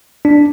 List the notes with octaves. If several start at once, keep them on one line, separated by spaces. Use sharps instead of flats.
D4